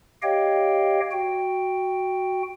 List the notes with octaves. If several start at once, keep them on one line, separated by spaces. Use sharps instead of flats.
G4 C#5 D#5 F5 G5
F#4 G5